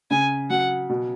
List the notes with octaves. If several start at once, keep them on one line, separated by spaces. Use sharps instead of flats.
C#3 G#5
F#3 F#5
B2